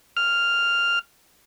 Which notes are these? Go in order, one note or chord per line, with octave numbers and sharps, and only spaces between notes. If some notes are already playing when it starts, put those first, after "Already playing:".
F6